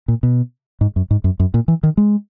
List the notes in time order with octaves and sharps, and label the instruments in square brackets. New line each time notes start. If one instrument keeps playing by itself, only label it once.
[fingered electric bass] A#2
B2
G#2
F#2
G#2
F#2
F#2
A#2
E3
D#3
G#3